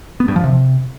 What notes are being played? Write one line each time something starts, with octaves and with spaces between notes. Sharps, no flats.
B3
G2
F3
C3